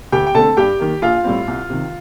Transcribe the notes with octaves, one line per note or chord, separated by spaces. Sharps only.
D2 G4 G5
G5
D3 A3 C4 A4 A5
G2 G4 G5
D#3 A#3
A#1 F4 F5
A2 G3 C4
C2
C3 D#3